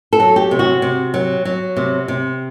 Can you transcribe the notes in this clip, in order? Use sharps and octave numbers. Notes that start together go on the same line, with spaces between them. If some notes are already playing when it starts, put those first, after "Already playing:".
A4
F#3
G4
C3
F#4
C3
F#3
F#3
C3
C3